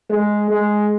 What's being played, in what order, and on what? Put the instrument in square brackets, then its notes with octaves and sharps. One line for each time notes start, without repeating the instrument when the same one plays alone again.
[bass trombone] G#3
G#3